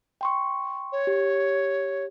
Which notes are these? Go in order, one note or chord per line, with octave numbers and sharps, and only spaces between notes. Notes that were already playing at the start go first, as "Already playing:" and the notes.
G5 C6 C#6
C#5
G4